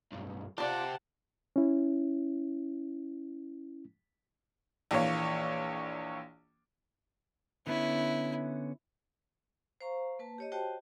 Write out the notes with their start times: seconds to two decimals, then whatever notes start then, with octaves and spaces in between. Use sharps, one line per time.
0.12 B1 G2
0.58 C4 F4 G4 D5 F#5 A5
1.56 C#4 E4
4.91 A#1 E3 A#3 C#5
7.67 D3 B3 C#4 E4
9.81 C5 F5 A#5 C#6
10.19 A#3 B4 A5
10.38 G4 C#5 D#5
10.52 F#4 G4 C5 D#5 G5 A5